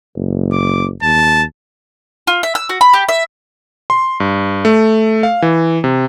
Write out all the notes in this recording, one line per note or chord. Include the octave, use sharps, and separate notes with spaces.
F#1
D6
D#2 A5
F4
E5
E6
F#4
B5
G4
E5
C6
G2
A3
F5
E3
C3